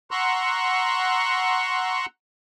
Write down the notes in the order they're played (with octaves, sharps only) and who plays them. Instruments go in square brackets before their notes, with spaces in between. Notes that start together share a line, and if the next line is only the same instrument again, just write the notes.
[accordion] F#5 A#5 C6 C#6 E6 F#6